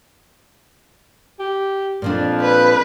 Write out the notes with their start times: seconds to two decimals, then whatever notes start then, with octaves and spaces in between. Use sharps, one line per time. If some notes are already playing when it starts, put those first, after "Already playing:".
1.39 G4
2.02 F2 A#2 F3 D4
2.40 B4